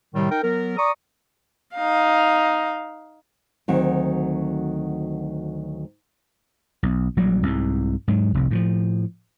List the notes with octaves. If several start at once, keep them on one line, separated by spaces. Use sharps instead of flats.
A2 C3 D#3 G3
D#4 A#4 G5
F#3 B3 A#4
D5 A#5 C#6 D#6
D#4 F5
D2 D#3 F#3 C4
B1
A#1 F#3 G3
C2 G#2
G#2 F#3
F1 C2
A2 E3 F3